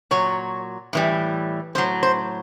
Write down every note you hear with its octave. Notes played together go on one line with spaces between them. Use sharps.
A#2 F#3 C#5
A2 E3 G3
A2 F#3 C5
C5